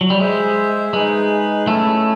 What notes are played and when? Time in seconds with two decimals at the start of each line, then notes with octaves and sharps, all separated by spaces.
0.01 F#3
0.10 G3
0.20 G#3 G#4 C5 E5
0.93 G#3 D#4 G#4 B4
1.67 A3 C#4 E4 A4